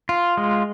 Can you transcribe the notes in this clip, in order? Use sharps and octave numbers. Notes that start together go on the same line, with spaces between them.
F4
G#3